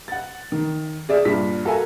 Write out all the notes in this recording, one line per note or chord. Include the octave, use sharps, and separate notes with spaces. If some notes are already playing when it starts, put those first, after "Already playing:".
F#5 A6
D#3
G#4 D5 E5
G2 A#2 B6
F#4 A4 A#4 E5 F5 G#5